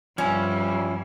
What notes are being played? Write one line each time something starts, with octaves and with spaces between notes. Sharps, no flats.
G2 F3 G3 C#4 E4